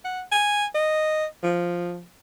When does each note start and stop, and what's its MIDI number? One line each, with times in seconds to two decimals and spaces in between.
0.04 0.22 78
0.32 0.65 80
0.75 1.25 75
1.43 2.03 53